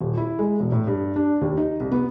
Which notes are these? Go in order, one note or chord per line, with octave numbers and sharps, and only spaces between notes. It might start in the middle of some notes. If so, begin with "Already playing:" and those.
D#1
E4
G#3
E1
A2
G2
D4
D#2
D#4
C2
B3